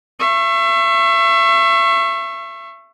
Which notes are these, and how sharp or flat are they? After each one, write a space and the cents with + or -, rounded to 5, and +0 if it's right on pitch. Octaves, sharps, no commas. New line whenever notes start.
E5 +30 C#6 -20